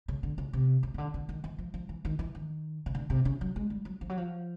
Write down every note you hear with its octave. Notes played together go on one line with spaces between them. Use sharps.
C#3
D3
C#3
C3
C#3
C#3
D3
D3
D#3
E3
F3
F3
E3
D#3
E3
D#3
C#3
D3
C3
C#3
F#3
G#3
G3
F#3
F3
F#3
F3